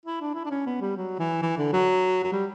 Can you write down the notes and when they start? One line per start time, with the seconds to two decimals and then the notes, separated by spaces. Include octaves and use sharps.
0.05 E4
0.21 D4
0.35 E4
0.45 D4
0.50 C#4
0.66 B3
0.81 G3
0.97 F#3
1.19 E3
1.42 E3
1.57 D3
1.73 F#3
2.23 F#3
2.32 G3